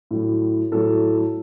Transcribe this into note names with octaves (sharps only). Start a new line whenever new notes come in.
A2 F#3
A2 F#3 A4